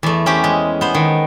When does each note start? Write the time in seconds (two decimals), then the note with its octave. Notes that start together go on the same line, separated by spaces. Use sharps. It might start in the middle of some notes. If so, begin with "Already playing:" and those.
0.03 E2 A3
0.26 C#4 G4 C5
0.44 G#3
0.81 B3 C5
0.94 D#3